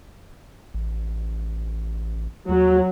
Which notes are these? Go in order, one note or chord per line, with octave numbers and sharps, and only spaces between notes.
A1
D#2 F#3